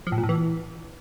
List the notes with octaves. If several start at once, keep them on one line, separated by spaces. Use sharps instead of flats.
F3
A2
A#2
A2
E3